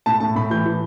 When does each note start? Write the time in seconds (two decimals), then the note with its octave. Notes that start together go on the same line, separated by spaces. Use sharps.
0.06 A2 A5
0.20 A2 A5
0.36 A2 B5
0.51 E3 G6
0.65 E3